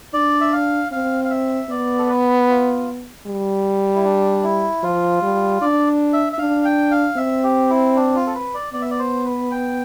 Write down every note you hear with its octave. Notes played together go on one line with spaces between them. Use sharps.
D4 D5
E5
F5
C4 F5
F5
E5
B3 D5
A4
B4
F4
G3
E4
D4
E4
F3 F4
G3
D4 D5
E5
E5
D4 F5
G5
F5
C4 E5
G4
E4
D4
F4
A4
B4
D5
B3 D5
E5
D5
C5
B4
G5